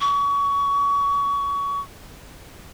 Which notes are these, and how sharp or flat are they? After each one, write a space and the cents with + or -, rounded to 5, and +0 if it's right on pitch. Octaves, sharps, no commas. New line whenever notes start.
C#6 +25